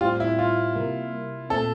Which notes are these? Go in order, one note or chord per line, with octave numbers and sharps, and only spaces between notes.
A2 G3 C4 F4 G4
E4
F4
C3 G3 A#3
A#2 A3 C4 A4